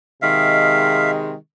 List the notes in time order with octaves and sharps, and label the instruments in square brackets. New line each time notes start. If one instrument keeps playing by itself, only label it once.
[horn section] C3 D#3 G#3 [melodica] E5 F5